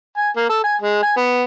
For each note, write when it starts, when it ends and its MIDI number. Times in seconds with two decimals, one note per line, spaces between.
0.18 0.29 80
0.37 0.46 58
0.49 0.60 69
0.64 0.76 80
0.81 0.98 56
1.03 1.14 80
1.17 1.43 59